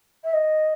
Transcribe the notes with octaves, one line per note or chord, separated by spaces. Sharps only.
E5
D#5